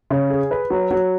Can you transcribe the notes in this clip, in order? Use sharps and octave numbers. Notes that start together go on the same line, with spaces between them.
C#3
G#4
B4
F#3
F#3